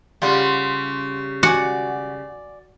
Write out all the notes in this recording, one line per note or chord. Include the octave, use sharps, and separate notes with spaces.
C#3 G3 F4 F#5 C6
F#4 D5 G#5 D6